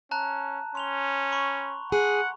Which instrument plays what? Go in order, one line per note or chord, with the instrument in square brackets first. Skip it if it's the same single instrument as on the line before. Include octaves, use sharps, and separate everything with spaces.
[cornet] C#4 [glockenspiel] A5 A#5 F#6
[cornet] C#4 [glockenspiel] C6 F7 G7
[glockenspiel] B5 C#6
[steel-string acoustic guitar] G#4 [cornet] F#5